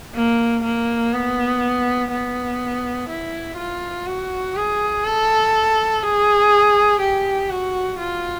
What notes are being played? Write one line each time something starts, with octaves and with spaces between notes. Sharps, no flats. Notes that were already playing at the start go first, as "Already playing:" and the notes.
A#3
A#3
B3
B3
E4
F4
F#4
G#4
A4
G#4
G4
F#4
F4